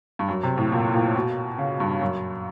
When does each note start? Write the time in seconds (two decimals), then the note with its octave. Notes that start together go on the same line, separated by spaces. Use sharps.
0.19 G2
0.29 F#2
0.43 C3
0.58 A2
0.72 A#2
0.93 A#2
1.16 B2
1.58 C#3
1.80 G2
2.01 F#2